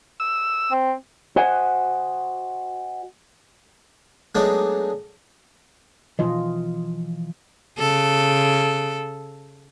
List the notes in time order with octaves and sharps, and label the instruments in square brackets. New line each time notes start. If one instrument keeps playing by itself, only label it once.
[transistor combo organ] E6
[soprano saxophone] C4
[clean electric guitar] F#4 C5 D#5 F#5 G#5
[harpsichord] F#3 G#3 A3 B3 D4 D#4
[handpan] B2 F4 D#5 [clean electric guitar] E3 F3 C6
[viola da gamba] C#3 A4